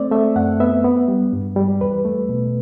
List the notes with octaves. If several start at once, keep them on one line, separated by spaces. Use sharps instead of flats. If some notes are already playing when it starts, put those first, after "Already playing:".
Already playing: A3 C4 D5
A3 E5
F#2 F#5
B3 E5
B3
G3
G2
G3
E2 B4
A3
B2